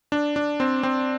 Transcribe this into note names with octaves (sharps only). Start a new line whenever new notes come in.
D4
D4
C4
C4